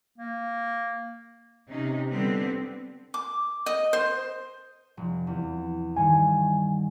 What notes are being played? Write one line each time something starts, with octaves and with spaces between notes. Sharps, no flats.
A#3
C3 C#4 D#4
D3 G3 B3 C4
D6
D#5
C5
F1
E2
G2 D#3 G#5